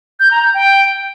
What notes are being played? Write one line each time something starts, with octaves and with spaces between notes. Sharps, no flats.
G6
A#5
G6
G5